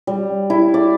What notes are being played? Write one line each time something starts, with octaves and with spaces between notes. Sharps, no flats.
G3
E4
D5